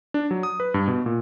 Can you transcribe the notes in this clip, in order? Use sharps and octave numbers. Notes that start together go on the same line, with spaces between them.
D4
F#3
D#6
B4
G2
B2
A#2